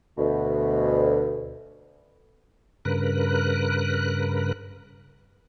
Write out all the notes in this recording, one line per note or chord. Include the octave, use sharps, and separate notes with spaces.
D2 B2
G2 C#3 A#4 B4 F#6